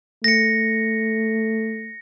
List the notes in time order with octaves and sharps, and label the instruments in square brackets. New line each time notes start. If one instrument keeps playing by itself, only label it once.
[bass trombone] A3 [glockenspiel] A#6 C#7